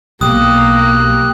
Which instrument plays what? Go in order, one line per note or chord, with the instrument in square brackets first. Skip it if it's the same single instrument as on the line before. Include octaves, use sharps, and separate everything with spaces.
[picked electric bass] B1 [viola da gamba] A#3 [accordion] G4 F#6 [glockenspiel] D#6